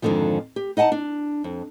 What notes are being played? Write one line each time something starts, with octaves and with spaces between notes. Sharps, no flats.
F2 G#2 B2 D3 D#3 F3
G4
D#4 D#5 F#5 G#5 A5
D4
F2